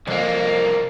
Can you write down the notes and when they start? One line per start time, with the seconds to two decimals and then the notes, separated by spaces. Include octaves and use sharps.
0.08 C2 F2 A#3